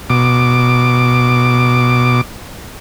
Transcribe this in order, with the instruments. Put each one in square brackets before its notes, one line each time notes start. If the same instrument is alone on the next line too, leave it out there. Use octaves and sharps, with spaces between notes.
[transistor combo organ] B2 D6